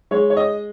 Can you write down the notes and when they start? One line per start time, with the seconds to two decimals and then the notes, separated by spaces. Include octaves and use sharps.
0.11 G#3 C#5
0.30 C#5
0.37 D#5